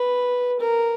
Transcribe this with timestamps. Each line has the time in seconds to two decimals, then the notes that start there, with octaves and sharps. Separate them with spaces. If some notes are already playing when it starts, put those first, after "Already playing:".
Already playing: B4
0.59 A#4